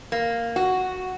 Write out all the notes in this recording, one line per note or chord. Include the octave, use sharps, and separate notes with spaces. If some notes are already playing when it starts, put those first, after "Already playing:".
A#3
F#4